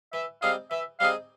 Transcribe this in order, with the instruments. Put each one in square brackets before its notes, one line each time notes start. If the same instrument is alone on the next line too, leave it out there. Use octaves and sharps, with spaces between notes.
[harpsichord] E3 [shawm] E5
[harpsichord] G3 C4 D#4 G#4 [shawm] F5
[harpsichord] E3 [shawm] E5
[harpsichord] G3 C4 D#4 G#4 [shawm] F5